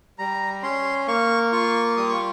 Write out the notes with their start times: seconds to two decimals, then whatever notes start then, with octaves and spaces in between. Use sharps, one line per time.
0.19 G3 A#5
0.63 C#4 C6
1.08 A#3 C#6
1.52 F4 C#6
1.97 G3 D#6
2.09 C#6